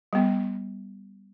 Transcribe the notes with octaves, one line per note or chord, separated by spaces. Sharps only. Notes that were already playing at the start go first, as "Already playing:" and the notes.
G3 B3